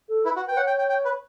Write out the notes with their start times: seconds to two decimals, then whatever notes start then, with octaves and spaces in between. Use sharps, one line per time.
0.09 A4
0.25 E4 B4
0.36 F#4
0.48 B4 G5
0.57 C#5 F#5
0.67 G5
0.79 G5
0.89 G5
1.05 B4